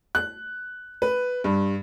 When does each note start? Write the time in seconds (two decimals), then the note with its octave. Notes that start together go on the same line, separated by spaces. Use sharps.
0.15 F#6
1.02 B4
1.44 G2